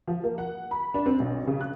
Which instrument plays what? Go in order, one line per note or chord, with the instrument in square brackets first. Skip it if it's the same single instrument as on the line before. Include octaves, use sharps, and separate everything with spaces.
[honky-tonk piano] F3
A#3
F#5
B5
D4
C4
B1
C#3
F#6